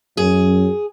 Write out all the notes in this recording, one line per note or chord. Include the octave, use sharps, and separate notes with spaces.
F#2 G#4